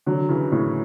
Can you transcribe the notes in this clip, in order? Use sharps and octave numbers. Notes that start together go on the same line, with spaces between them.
D3 F#3
C#3 E3
A2 C#3